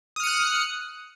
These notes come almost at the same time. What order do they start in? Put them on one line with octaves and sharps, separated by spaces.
D#6 F6 C#7 F#6